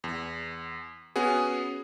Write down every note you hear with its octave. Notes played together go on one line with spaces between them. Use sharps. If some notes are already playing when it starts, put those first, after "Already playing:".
E2
B3 C#4 F#4 G#4